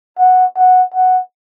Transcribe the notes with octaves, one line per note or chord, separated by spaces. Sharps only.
F#5
F#5
F#5